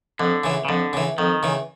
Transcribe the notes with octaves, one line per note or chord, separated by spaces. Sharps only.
F2 D3
C#3 E3
C#3
F2 D3
C#3 E3
F2 D#3
C#3 E3